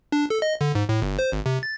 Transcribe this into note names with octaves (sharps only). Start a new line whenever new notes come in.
D4
A4
D#5
D3
G#2
A2
G1
C5
G#1
C3
A6